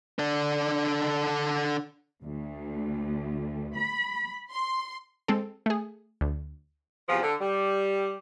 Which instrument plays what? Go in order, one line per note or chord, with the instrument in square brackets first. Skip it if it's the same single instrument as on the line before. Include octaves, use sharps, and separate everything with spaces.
[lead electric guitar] D3 D4
[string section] D2
B5
C6
[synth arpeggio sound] G#3 C4 A4
A3 G#4
D2
[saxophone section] E2 C3 F3
D3
G3